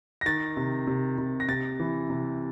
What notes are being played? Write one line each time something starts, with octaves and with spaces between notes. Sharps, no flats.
A#6
D#3 A6
C3
C3
C3
A#6
C3 A6
E3
C3